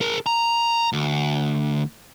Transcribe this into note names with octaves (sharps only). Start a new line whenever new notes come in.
G#4 A#4
A#5
D2